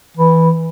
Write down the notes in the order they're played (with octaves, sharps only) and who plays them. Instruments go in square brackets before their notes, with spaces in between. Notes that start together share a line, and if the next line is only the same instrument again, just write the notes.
[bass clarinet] E3